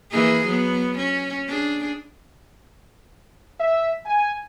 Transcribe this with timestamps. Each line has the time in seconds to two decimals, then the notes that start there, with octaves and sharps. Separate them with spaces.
0.12 E3 A#3 G#4
0.45 F#3 B3
0.98 C#4
1.48 D4 G#4
3.60 E5
4.06 G#5